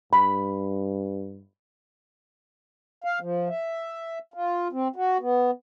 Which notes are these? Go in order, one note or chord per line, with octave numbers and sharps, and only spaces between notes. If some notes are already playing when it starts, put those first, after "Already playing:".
G2 B5
F5
F3
E5
F4
C4
F#4
B3